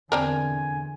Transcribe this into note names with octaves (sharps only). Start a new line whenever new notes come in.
E2 D3 C4 D4 A#4 G#5